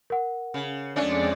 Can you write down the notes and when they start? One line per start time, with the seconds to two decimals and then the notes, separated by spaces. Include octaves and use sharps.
0.10 A#4 F#5
0.54 C#3
0.96 F2 G#3 A3 C#4 D4 D5